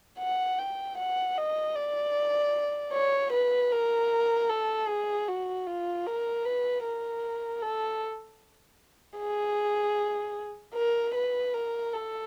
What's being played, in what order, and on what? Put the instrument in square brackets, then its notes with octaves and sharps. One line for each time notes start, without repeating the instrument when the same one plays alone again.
[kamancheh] F#5
G5
F#5
D#5
D5
C#5
B4
A#4
A4
G#4
F#4
F4
A#4
B4
A#4
A4
G#4
A#4
B4
A#4
A4